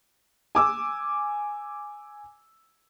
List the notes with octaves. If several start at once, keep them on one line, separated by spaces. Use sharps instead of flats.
G#5 D6 E6